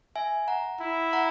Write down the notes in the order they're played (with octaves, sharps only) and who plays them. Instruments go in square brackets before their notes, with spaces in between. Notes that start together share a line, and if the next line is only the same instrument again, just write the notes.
[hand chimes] E5 G#5
F#5 A#5
[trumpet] E4
[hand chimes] F#5 A#5